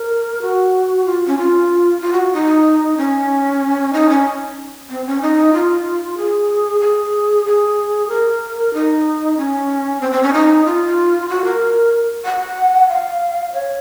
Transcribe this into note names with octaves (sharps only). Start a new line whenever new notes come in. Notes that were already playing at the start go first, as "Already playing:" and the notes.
Already playing: A#4
F#4
F4
C#4
F4
F4
F#4
D#4
C#4
D#4
C#4
C4
C#4
D#4
F4
G#4
G#4
G#4
A#4
D#4
C#4
C4
C4
C#4
D#4
F4
F#4
A#4
F#5
F5
C#5